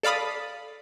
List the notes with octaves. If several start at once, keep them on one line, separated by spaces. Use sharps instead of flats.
A4 D5 F5 B5 D#6